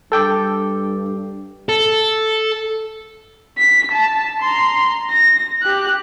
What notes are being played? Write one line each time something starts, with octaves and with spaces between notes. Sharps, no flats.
G2 A4 G5 D6
A4
B6
A5
A#5 C6
A#6
G4 F#6